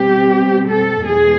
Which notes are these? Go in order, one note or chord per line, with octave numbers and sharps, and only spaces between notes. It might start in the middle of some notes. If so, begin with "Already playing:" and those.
Already playing: B2 G3 C4 G4
A4
E2 B2 G#3 G#4